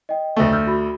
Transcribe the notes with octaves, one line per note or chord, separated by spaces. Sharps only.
D#5 G5
D2 A3
E6 F6 G6
F#4 B5